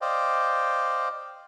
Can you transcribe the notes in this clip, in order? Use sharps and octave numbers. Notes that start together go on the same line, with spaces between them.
C5 D5 D#5 F5 G5